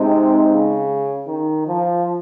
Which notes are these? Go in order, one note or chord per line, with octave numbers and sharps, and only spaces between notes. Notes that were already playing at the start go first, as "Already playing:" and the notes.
Already playing: C3 G#3 C4 D#4
C#3
D#3
F3